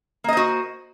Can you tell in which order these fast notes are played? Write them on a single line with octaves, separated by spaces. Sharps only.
A#3 D#5 C5 F#4